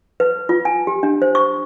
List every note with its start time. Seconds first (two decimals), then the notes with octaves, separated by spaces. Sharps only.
0.20 B4
0.49 F4
0.65 G#5
0.87 G4
1.03 D4
1.22 C5
1.35 C#6